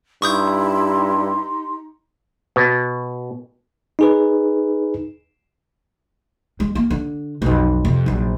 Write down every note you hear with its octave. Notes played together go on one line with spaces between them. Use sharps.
G2 D#4 E4 G4 C6 C#6 D#6 G6
B2
D#4 G#4 B4
G#3
A#3
D3
B1 F2
F2 C3
A#1 F#3